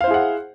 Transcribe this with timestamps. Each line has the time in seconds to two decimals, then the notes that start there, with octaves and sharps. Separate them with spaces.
0.01 F5
0.04 C5
0.07 E4
0.11 G#4
0.14 F#5